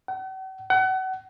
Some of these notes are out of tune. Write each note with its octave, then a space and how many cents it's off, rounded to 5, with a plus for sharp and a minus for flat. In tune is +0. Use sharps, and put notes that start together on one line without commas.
F#5 +45
F#5 +30